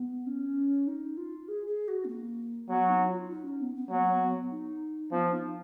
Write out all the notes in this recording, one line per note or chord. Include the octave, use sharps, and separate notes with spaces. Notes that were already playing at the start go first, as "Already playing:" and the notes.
Already playing: B3
C#4
D#4
F4
G#4
G#4
F#4
B3
A#3
F#3 B3
D#4
F4
D#4
C#4
B3
B3
F#3 A#3
B3
D#4
F3 B3
D#4